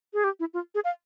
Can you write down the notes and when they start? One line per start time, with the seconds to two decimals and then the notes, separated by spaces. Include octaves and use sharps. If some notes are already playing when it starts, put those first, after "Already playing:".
0.14 G#4
0.24 G4
0.40 E4
0.54 F4
0.75 G#4
0.84 F5